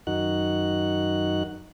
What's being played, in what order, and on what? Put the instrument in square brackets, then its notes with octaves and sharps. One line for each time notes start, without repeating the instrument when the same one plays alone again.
[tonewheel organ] F#2 D#3 D#4 F#4 F#6